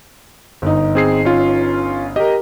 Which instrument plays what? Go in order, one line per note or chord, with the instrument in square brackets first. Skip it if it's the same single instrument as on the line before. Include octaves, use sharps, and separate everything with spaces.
[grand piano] G1 D#4
[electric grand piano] C4 G#4 C7
C#4 F4
[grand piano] G4 A#4 [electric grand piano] D#5